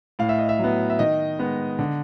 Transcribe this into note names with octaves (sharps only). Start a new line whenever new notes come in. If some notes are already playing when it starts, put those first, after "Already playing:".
A2 F5
E5
D#5
E5
F#3 B3
E5
D#3 D#5
G#3 B3
D3